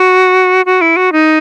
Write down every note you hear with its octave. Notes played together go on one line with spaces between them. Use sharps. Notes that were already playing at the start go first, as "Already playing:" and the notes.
Already playing: F#4
F#4
E4
F#4
D#4